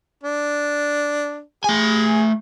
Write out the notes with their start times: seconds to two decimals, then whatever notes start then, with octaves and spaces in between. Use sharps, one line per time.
0.23 D4
1.64 A3 G#4 G#5